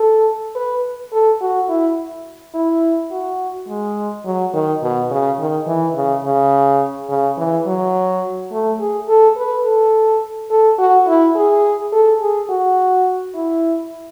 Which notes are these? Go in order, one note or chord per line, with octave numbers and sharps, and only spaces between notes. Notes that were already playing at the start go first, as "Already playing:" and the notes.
Already playing: A4
B4
A4
F#4
E4
E4
F#4
G#3
F#3
D#3
B2
C#3
D#3
E3
C#3
C#3
C#3
E3
F#3
A3
G#4
A4
B4
A4
A4
F#4
E4
G#4
A4
G#4
F#4
E4